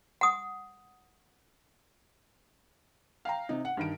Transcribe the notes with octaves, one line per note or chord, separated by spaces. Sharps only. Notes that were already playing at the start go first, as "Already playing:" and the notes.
F#5 D#6
F5 G5 A#5
C3 D#4
F#5
G2 D#3 D7